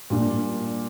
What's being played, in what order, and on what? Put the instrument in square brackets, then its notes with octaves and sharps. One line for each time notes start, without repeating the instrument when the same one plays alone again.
[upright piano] A#2 G3 D4